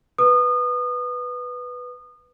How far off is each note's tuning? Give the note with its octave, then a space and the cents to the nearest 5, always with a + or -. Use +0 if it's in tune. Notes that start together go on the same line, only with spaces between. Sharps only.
B4 +0 D#6 -30